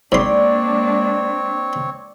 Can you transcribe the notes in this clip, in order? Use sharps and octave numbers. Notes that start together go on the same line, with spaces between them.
G#2 G#3 A#3 C4 D4 C#5 D5 C6